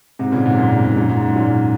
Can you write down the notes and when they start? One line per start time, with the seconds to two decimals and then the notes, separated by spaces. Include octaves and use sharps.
0.19 G#2 C3
0.32 A#2 C#3
0.45 G#2 C3
0.58 F#2 A#2
0.71 G#2
0.84 G#2
0.96 F#2 A#2
1.09 G#2
1.22 G#2
1.36 F#2 A#2